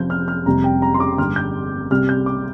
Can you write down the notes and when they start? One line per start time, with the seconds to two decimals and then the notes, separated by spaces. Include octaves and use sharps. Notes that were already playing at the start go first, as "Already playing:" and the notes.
Already playing: F1 F2 F3 G6
0.10 F6
0.28 F6
0.46 F1 F2 C3 G3 A#5
0.64 G5
0.82 A#5
0.94 C6
1.00 D6
1.18 G1 G2 G3 F6
1.36 G6
1.91 C2 C3 G3 F6
2.09 G6
2.26 D6